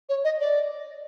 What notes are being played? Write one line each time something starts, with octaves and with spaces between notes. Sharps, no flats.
C#5
D#5
D5